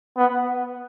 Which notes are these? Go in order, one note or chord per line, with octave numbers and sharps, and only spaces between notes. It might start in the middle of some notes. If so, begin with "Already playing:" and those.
B3